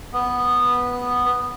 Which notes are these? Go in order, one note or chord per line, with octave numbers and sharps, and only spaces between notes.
B3